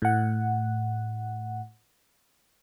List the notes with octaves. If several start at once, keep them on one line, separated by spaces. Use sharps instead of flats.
A2 F#5